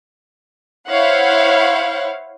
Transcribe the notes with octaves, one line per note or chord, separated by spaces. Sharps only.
E4 C5 C#5 F5 F#5